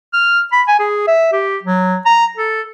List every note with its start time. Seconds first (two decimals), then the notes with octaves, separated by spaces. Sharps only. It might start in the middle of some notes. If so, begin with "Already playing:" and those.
0.13 F6
0.52 B5
0.68 G#5
0.79 G#4
1.07 E5
1.32 G4
1.63 F#3
2.05 A#5
2.37 A4